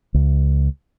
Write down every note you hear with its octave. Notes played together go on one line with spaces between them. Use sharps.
C#2